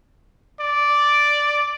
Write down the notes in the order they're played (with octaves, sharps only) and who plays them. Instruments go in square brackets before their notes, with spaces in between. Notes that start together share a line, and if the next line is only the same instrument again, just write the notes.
[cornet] D5